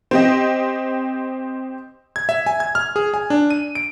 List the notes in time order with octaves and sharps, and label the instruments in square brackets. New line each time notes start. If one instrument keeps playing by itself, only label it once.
[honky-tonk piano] C4 G4 D#5
[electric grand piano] G#6
E5
G#5
G#6
F6
G#4
G#5
D4
D#7
D7